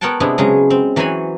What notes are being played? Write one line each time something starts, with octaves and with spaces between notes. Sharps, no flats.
B3 A#4 C#5 F#5 G5 A5
C3 G#3 B3 D4 E4
C#3 F#3 G#3
C4
E3 F#3 F#4 C5 G#5 B5